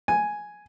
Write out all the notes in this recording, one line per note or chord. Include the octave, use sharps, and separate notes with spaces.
G#5